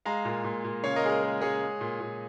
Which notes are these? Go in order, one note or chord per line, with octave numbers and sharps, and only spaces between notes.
G#3 F5 A#5
A#2
A#2
A#2
C#3 C#5 F5
A#4 D#5
G#3 G#4
A#4
G#3 A#4
G#3 G#4 C#5
G#3
A#2
A#2